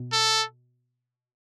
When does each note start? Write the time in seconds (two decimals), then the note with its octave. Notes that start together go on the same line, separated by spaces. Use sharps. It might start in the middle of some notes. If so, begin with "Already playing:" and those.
Already playing: B2
0.12 A4